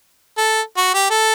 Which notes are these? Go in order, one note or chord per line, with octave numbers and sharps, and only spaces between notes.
A4
F#4
G4
A4